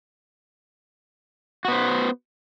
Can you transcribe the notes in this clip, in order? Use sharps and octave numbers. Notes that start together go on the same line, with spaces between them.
B3 F#4 C5